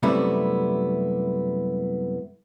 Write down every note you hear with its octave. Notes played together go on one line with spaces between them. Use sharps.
F#2 C3 G3 A3 B3 E4